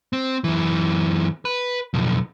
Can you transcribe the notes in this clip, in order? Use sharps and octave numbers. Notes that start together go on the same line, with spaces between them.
C4
F#2 E3
B4
B1 F2